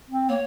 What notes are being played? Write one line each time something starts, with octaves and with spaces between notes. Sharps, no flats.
C4
A#3 C#5